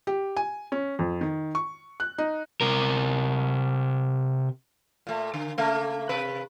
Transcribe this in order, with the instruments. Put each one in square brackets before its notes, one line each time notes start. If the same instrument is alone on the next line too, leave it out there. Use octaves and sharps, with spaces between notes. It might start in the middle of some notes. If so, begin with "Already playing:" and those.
[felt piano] G4
G#5
C#4
F2
D#3
C#6
F#6
D#4
[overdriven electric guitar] C3 A#4
[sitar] A#2 A3
D3
C#3 A3 A#3
C3 B4